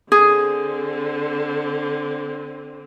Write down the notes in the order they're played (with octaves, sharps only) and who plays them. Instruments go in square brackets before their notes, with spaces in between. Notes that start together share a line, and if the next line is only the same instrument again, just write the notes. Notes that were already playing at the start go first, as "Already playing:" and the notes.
[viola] D3 C4 [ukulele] G#4